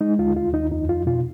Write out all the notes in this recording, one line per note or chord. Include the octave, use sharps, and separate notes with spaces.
G#3 D#4
D2 F4
D#2 F4
D#2 D#4
F2 D#4
F2 F4
B2 F4